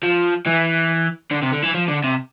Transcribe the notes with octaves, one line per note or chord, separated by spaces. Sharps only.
F3
E3
D3
C3
D3
E3
F3
D3
C3